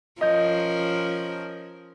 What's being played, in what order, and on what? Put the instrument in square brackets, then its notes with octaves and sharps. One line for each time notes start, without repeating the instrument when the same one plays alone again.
[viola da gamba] F3 C#4 A#4 [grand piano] D#5 G6